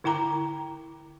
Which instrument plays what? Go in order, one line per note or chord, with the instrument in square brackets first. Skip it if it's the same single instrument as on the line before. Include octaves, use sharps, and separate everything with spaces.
[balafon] D3 E4 G5 A#5 D6